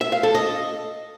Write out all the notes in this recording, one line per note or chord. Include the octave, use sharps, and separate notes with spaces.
E5
F5
A4
D#5